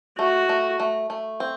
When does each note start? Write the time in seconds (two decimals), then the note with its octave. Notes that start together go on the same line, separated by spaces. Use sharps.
0.19 A3 F#4
0.49 A3
0.80 A3
1.10 A3
1.40 C4